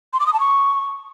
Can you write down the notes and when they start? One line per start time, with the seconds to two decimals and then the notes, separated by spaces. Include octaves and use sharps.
0.13 C6
0.20 D6
0.26 D#6
0.33 A5
0.40 C#6